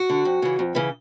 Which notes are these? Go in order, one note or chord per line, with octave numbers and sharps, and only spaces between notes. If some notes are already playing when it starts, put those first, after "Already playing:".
Already playing: F#4
D3
F2
C#3 E3
F2
C#3 E3